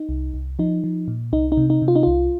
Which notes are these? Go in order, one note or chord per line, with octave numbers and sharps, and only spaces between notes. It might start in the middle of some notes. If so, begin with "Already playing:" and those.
Already playing: D#4
C2
C2
F3 D#4
F3
A#2
C2 D#4
D#4
C3
D#4
C3
F4
D#4
C2 F4